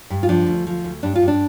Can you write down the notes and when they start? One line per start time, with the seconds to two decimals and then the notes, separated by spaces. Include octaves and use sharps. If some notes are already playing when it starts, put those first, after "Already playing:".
0.10 G2
0.23 F4
0.29 F3 D4
0.47 D2
0.67 F3
0.84 D2
1.03 G2 D4
1.15 F4
1.22 G2
1.28 D4